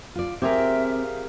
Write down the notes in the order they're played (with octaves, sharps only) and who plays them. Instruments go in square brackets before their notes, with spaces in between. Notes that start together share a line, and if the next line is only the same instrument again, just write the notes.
[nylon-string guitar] F4 D5
[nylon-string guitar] C4 [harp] G4 G#4 A#4 [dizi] E5
[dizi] F5